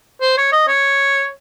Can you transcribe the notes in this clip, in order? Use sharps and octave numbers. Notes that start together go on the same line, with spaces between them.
C5
C#5
D#5
C#5